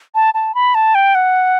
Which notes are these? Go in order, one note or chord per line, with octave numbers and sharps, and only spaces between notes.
A5
A5
B5
A5
G5
F#5